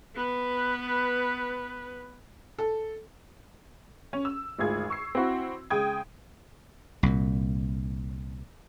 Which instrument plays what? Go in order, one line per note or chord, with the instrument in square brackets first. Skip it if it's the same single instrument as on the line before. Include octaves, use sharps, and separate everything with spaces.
[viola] B3 B4
[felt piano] A4
[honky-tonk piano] C#4
E6
G#1 D2 F4 G#4 G#6
C#6 E6 C7
C4 E4 F#4
C#3 G#3 G5 D#6 G#6
[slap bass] C2 A#2